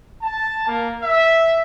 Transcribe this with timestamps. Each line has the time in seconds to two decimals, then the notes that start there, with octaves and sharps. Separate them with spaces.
0.22 A5
0.66 A#3
1.02 E5